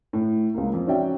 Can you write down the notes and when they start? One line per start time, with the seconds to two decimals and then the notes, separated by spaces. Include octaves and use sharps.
0.13 A2
0.54 C#2 A#3
0.73 F2
0.87 C#4 D#4 F#4 D5 E5 G5